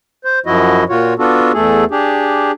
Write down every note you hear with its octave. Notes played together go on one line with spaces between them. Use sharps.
C5
F#2 F3 E4 F#4 D#5
A#2 F4 F#4 C#5
B3 D4 F4 F#4 A4
E2 A3 G#4 A4
D4 G4 G#4